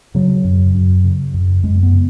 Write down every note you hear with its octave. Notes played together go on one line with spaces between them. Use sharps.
C#3 F#3
F#2
F#2
C#3
F#2
F#2 G#3
B3
C#3